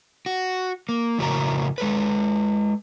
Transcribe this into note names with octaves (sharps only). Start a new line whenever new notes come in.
F#4
A#3
F2 A2 C#3 F#4 A#4 A#5
G#3 A4 B4